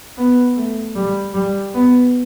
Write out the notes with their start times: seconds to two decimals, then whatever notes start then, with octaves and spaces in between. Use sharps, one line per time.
0.17 B3
0.56 A3
0.95 G3
1.34 G3
1.74 B3